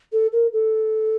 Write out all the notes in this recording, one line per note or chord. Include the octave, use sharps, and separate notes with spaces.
A4
A#4
A4